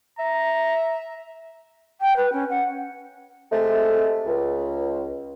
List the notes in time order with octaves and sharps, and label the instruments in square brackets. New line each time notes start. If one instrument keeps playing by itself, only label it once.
[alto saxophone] E5 [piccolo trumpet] A#5
[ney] G5
B4
C#4
F#5
[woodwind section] C3 G#3 A3
C#2